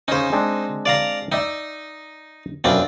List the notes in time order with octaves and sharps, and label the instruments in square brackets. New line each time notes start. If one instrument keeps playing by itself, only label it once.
[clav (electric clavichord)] C#3 C#4 [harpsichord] D#4 C5
[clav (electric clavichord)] G#3 C4 D4
[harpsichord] D5 F5 A#5
[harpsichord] D#4 [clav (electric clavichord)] D5 E5 G5
[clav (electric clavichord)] F#2 B2 [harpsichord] C4 D4 F4